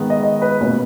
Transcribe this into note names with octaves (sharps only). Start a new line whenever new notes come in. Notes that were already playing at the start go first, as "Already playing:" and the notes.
Already playing: D#3 G#3 B3
D#5
D#5
B4
B2 A#3 C#4 B4